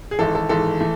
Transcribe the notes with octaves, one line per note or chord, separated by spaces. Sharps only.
G#4
G#1 G#2 E3 A4
A4
G#1 G#2 E3 A4
E3 A3